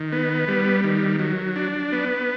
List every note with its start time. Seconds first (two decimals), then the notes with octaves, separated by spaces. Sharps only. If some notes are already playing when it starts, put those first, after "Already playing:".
Already playing: D#3
0.12 B3
0.48 G3
0.84 D#3
1.19 F#3
1.56 D4
1.92 B3